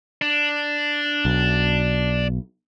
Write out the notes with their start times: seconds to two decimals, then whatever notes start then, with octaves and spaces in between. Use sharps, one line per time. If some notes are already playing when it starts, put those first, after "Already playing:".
0.22 D4
1.25 B1